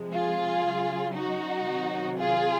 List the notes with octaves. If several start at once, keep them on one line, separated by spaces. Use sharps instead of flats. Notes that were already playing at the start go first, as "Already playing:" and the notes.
Already playing: C3 F3 G#3
F4 G#4
C#3 F#3
D#4 F#4
C3 D#3 F#3
F4 G#4